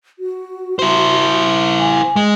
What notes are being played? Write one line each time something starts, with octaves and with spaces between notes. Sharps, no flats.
F#4
E4 C5
G#5
G#3